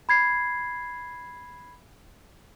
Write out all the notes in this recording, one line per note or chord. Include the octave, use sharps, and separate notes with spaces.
B5 G#6 C7